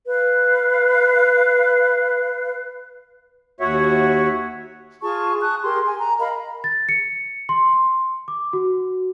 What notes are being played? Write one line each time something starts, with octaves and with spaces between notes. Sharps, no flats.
B4 F5
D#2 F#4 C#5 E5 F#5
F4 G#4 A5 C#6
A5 C#6 D#6 F#6
G4 G#4 A#4 C6
G#5
A#5
A#4 D#5 F5 B5
A6
C#7
C6
D6
F#4